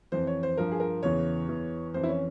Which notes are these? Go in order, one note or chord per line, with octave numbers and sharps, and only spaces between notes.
F2 E3 C5
C#5
C5
G2 F3 A#4
G#4
A#4
E2 C#3 E3 C#5
E2 E3
F2 E3 C5
E4
C#4